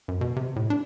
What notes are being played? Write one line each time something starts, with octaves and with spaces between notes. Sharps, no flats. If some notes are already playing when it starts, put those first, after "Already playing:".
F#2
B2
C3
A2
D4